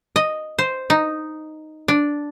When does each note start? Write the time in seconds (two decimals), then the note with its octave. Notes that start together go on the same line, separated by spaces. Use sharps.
0.16 D#5
0.58 C5
0.90 D#4
1.88 D4